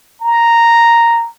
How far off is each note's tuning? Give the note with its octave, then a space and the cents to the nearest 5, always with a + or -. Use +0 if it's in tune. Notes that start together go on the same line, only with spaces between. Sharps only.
A#5 -5